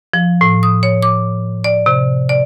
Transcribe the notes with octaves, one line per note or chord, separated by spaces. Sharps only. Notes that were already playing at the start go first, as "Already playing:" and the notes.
F3
A2
D#6
C#5
D6
D5
C3
D5